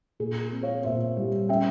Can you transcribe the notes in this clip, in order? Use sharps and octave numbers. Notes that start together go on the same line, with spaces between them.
A#2 G#4
C4
C#5 F5
A#2 C5 E5
G3
C#4 E5 G5